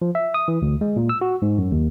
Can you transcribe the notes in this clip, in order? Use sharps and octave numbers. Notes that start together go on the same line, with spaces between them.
F3
E5
D#6
E3
D2
G#3
A#2
E6
F#4
G#2
F#2
D#2